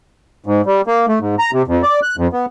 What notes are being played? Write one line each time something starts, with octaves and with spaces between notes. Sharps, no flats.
G#2
G3
A#3
A3
G#2
A#5
C3
F2
D5
F#6
F2
B3